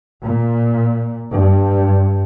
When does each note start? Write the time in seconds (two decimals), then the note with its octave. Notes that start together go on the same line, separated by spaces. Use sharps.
0.24 A#2
1.30 G2